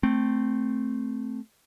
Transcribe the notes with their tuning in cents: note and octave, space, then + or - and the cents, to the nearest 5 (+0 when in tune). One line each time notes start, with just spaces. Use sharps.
A3 +0 C4 +0